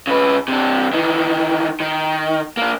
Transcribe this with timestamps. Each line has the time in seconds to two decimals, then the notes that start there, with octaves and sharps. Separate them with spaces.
0.07 C#3 B4
0.48 C3 D4
0.93 D#3 E3
1.80 D#3
2.57 A#3 D4